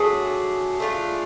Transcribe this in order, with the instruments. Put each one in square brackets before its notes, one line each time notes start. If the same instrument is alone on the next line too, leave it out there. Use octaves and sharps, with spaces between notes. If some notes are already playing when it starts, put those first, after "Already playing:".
Already playing: [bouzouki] F#3 A3 D4 [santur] G#4
[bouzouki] A3 D4 F4